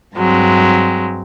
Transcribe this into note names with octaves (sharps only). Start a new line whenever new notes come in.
G2 F#3 G#3 C4